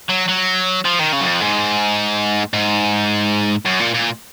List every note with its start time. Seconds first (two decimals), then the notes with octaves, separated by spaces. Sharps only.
0.10 F#3
0.29 F#3
0.85 F3
0.99 D#3
1.13 C#3
1.21 F#2
1.27 F2
1.41 G#2
2.54 G#2
3.66 F#2
3.80 A#2
3.94 A#2